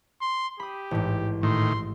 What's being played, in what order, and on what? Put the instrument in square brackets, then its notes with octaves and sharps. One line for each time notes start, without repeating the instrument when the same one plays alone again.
[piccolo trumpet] C6
[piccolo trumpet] G4 [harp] B5 D#6
[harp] A1 G#2
[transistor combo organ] A2 D#3 [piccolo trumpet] C6